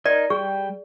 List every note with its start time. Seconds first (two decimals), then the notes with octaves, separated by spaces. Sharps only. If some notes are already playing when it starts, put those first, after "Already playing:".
0.06 D#4 A#4 D5 D#5
0.30 G3 G#4 G5